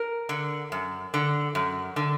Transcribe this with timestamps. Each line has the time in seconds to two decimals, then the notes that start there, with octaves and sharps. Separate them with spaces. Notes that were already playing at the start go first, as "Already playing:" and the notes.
Already playing: A#4
0.29 D3
0.72 F#2
1.14 D3
1.55 F#2
1.96 D3